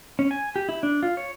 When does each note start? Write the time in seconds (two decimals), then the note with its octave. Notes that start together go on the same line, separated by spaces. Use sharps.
0.19 C#4
0.31 G#5
0.56 G4
0.69 E4
0.83 D4
1.03 F4
1.17 C#5